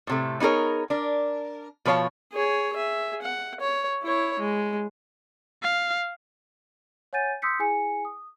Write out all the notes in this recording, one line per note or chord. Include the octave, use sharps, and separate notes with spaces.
A2 C3 A3
B3 D#4 G#4 A#4 C#5
D4 A#4
B2 F3 B4 C#5 F5 A5
G#4 C#5
G#4 E5
F#5
C#5
E4 C#5
G#3
F5
C#5 F#5 G#5 G6 A6 D#7
C6 D#6 E6 G6 B6 C#7
E4 G#4 G#5 C#7
D#6